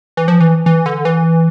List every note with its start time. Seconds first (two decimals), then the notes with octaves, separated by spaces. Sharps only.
0.17 E3
0.28 F3
0.40 E3
0.66 E3
0.86 D3
1.05 E3